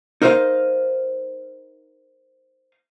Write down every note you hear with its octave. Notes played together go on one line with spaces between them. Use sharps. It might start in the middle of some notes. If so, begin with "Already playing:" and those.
D#4 A#4 C5 D#5 F5